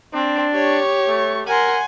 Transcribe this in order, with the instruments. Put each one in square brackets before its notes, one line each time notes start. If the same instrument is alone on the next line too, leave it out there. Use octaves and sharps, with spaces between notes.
[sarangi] C4 [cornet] D4
[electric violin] G4 C#6 [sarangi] C#5
[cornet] A3
[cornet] A#4 [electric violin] F#5 C6 [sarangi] G#5